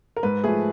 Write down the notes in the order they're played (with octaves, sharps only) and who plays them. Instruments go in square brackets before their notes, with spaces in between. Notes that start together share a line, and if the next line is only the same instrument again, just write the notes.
[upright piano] A#4
G#2 B4
F3 A3 G#4